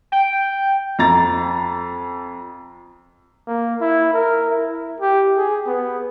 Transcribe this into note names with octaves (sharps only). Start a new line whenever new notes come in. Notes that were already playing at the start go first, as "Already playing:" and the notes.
G5
F2 A#5 A6
A#3
E4
A#4
E4
G4
G#4
B3